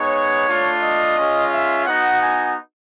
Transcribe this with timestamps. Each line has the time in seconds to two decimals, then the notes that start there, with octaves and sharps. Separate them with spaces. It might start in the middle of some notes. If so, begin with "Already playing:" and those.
Already playing: G#3 B3 D#4 C#5
0.47 A3 D4 F4
0.82 D#5
1.17 G#3 C#4 F4
1.51 E5
1.85 B3 D#4 F#4 F#5
2.21 G#5